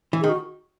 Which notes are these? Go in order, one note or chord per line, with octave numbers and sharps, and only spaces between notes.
E3
D#3 G#4
F#4